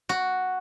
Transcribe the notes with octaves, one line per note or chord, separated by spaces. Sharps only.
F#4